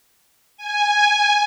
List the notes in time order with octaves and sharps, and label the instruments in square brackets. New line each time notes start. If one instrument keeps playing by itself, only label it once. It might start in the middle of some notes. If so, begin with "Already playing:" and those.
[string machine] G#5